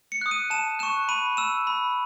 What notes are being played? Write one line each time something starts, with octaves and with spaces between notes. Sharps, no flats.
C#7
D#6 F#6
D#7
A5 E7
C#6 F#6 E7
B5 D#7
E6 E7
B5